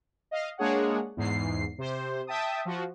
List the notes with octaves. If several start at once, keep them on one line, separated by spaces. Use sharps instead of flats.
D#5 F5
G#3 A#3 D4 G#4 C#5 F#5
E2 G#2 C7
C3 C5
E5 G5 A5 D#6
F3 F#4